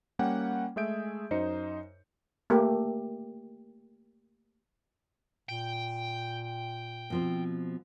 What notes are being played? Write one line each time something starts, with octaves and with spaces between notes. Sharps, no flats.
G3 A#3 C#4 F#5 G5
G#3 A3 G#4 E5 G6 D7
F#2 D#4 C5 D#5 C#7
A3 A#3 G4
A#2 G5
B2 F3 C4